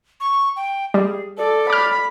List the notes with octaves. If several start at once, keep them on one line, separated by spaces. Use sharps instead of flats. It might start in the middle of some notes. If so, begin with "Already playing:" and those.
C#6
G5
G3 G#4
A4 D5
B5 D6 F6